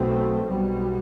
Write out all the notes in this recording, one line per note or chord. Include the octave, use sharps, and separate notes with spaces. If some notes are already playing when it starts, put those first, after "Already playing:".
Already playing: B1 B2 A3 C4
B1 B2 G3